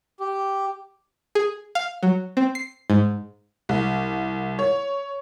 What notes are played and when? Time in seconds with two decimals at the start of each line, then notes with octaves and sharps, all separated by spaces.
0.20 G4
1.35 G#4
1.75 F5
2.03 F#3
2.37 C4
2.55 C7
2.90 G#2
3.69 C2
4.59 C#5